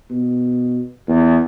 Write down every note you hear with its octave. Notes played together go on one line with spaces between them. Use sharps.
B2
E2